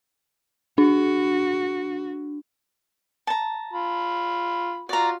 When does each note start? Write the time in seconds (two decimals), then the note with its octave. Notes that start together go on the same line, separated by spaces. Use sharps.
0.78 D4 F#4
3.27 A5 A#5
3.73 F4 B5
4.89 F4 F#4 D5 A#5